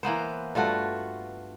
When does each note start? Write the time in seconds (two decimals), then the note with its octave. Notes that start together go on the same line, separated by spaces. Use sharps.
0.03 E3 A#3 B3 C5
0.55 G2 A3 F4 F#4